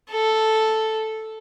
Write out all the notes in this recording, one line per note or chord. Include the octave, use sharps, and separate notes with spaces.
A4